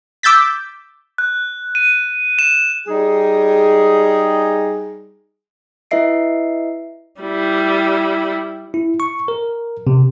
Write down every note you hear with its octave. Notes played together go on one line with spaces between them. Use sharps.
D6 E6 G6 A6 B6
F#6
D#7
E7
G3 D#4 G#4
E4 B4 D#5 E5 C7 D7
G3 E4
E4
C#6
A#4
C3